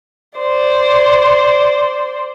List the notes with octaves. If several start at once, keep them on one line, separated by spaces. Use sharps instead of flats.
C5 D5